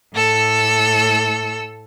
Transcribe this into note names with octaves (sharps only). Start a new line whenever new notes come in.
A2 A4 E6